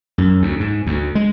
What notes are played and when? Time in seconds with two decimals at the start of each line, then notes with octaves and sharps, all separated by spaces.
0.18 F#2
0.42 D2
0.60 G#2
0.87 D2
1.15 G#3